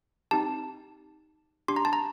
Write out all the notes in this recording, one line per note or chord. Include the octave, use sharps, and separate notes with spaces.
C4 D#4 G4 A5
D4 G4 C6
A#5
A5
A#5